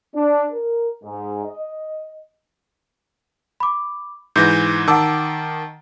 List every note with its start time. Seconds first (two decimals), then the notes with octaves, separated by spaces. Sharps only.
0.15 D4
0.52 A#4
1.04 G#2
1.46 D#5
3.60 B5 D6
4.36 G#2 E3 G6 A#6
4.88 D#3 F#5 A5 D6 E6